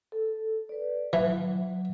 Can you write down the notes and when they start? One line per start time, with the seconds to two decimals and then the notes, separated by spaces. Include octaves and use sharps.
0.12 A4
0.69 B4 D5
1.13 E3 F#3